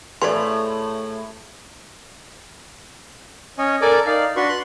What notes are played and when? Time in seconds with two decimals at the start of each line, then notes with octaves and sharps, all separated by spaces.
0.22 A2 E3 A3 G#4 B4 D5 C6
3.58 C#4 C#5 D#5 G#5
3.82 A4 A#4 D5 G#5 D6
4.06 D#4 D5 F5
4.36 D4 F#4 B4 C6 C#6
4.49 C6 F#6